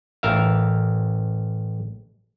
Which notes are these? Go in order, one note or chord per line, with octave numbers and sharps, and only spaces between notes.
A1 A#4 E5 F5